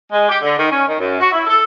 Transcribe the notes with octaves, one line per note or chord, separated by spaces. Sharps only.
G#3
G4
D3
D#3
C#4
D#3
F#2
F#4
E4
A4